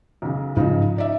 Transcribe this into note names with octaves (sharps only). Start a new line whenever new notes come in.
B1 C#3
G#2 C#3 F3 D#4
D#4 D5 E5